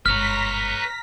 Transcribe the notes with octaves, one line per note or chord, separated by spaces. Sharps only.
G1 G#2 B4 C#5 A#5 F6 A#6 B6